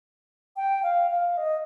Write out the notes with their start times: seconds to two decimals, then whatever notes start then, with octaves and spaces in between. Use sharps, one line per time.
0.56 G5
0.83 F5
1.10 F5
1.37 D#5